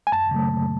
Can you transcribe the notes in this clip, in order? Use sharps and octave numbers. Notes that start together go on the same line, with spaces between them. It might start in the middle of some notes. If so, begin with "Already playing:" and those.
G#5
F#2 A5
C#3 F#3 A3
F#2